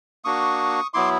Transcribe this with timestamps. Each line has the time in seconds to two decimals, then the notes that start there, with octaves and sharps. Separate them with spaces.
0.25 A#3 D4 F#4 C#6 D#6
0.94 F#3 B3 E4 C6 D6